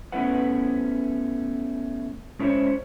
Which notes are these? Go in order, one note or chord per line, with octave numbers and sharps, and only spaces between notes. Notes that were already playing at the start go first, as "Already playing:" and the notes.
A3 B3 C#4 E4 B4 F#5
G#3 C#4 E4 A#4 C5 C#5